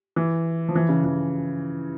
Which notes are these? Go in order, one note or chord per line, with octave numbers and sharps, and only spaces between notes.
E3
F3
E3
C#3
E3